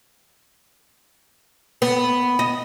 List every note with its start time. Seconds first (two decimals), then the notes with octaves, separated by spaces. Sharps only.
1.82 B3
2.39 D#5